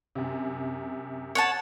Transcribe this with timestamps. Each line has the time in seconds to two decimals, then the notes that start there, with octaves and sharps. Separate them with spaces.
0.15 F#2 C3
1.35 C#5 F#5 A5